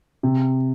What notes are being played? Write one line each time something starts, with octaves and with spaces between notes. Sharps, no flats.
C3